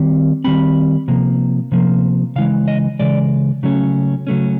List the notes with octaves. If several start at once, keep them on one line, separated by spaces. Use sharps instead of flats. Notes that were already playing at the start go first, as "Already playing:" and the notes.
Already playing: D#3 G3 C4
D#3 G3 C4 B5
C3 F3 A#3
C3 F3 A#3
C#3 E3 G#3 F5
D#5
C#3 E3 G#3 D5
C#3 F#3 A3 C#4
C#3 F#3 A3 C#4